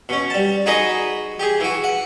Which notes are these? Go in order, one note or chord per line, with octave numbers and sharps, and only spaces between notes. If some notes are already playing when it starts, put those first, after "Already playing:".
B2 C#4
G3 A5
D#4 F#4 G#4 B4 D#5
G4 G#4
E3 F#4
F#5